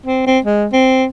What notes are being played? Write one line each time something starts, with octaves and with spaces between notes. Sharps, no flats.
C4
C4
G#3
C4